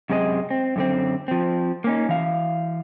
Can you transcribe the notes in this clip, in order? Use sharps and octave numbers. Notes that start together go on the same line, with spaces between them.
F#2 C3 G#3 C4 D#5
C4
F#2 D3 C4
F3 C4
A#3 C#4 D#4
E3 F5